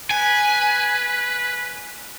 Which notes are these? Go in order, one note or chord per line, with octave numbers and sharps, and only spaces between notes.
B4 G#5